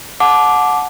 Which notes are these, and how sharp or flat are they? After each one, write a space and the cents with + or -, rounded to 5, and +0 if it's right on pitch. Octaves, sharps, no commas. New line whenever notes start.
F#5 -25 A5 -25 D6 +0